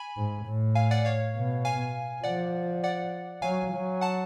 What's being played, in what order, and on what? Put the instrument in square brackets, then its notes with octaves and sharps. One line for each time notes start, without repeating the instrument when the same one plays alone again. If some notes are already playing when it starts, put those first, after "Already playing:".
Already playing: [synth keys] G#5 B5
[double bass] G#2
A2
[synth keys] F5 G#5
D5 F#5
C#5 F5
[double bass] B2
[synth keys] F5 G#5
[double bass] F3 [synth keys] D5 F#5
[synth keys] D5 F#5
[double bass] F#3 [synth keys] F5 G#5
[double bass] F#3
[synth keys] F#5 A5